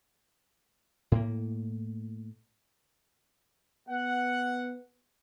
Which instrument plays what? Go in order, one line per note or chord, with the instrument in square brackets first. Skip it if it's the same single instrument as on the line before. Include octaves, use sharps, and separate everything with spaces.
[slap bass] A2 A#3
[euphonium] B3 [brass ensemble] F#5